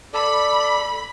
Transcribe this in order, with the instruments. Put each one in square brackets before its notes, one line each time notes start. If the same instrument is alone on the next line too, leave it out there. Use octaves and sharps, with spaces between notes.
[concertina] A4 D5 [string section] B5